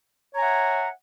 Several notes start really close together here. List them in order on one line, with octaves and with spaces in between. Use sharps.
C#5 A#5 G#5 F#5 E5